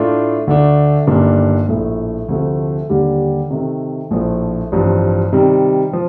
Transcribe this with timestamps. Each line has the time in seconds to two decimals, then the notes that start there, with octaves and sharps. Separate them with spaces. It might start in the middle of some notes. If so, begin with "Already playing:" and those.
Already playing: A2 A3 D4 F4
0.47 D2 D3 A3 D4
1.07 G1 G2 D#3 A#3 D4
1.68 A#1 A2 A3
2.29 D2 C3 F3 A3
2.90 D#2 D3 G3 D4 G4
3.50 C3 D#3 A3
4.11 A#1 A2 F3 A3
4.72 A1 G2 F3 C4
5.33 C3 D#3 G3
5.93 F3